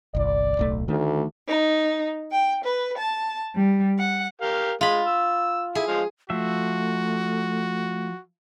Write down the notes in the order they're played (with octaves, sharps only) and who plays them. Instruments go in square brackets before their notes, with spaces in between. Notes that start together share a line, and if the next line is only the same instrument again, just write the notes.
[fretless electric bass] G1 C2 [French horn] D5
[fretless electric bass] D1 B1 A3
[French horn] D2 [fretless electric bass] D#3 A3
[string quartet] D#4
G5
B4
A5
G3
F#5
[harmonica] G4 A#4 F5
[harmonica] G#3 [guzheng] F4 B5
[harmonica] E6
[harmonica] E4 [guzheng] G#4
[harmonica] F3 G#3 F5
[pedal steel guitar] F3 E5 [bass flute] A3 [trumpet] F#4